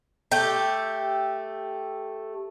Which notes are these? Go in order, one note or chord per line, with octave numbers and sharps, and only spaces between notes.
A3 G4